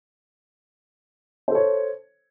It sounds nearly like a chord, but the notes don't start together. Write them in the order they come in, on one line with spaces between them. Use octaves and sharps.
C5 A4 C#5